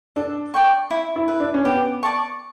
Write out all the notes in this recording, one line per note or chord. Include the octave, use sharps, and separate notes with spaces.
D4 A4
D5 G5 C#6
E4
E4
B4 E5
D4
C#4
B3 G4
D5 A5 C#6